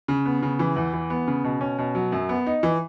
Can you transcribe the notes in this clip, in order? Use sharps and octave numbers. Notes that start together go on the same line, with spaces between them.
C#3
B3
C#3
E3
E2
E3
B3
C#3
B2
C#4
B2
F#3
F#2
B3
D#4
E3